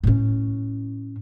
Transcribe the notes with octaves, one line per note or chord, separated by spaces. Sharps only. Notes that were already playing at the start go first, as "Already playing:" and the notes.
A2 C#4